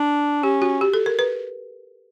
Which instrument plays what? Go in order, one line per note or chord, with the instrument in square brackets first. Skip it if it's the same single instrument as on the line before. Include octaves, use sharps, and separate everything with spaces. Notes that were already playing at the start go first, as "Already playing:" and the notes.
Already playing: [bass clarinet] D4
[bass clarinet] C#4 [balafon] G4
[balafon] F#4
G4
A4
A#4
B4